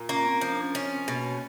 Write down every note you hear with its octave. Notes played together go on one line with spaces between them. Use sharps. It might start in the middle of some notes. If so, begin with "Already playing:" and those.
Already playing: A#2
A#3 C#4
C4
F3
D4
C#4
C#4
C4
B2 A#3